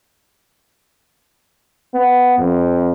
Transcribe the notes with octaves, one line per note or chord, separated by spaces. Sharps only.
B3
F2